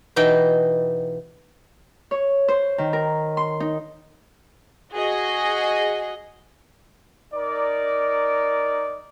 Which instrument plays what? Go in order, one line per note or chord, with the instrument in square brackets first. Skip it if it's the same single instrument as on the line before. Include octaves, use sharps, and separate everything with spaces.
[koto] B2 E3 D#4 G5
[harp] C#5
C5
D#3
A#4
C6
D#4
[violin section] F#4 G#4 D#5
[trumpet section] D#4 A#4 D5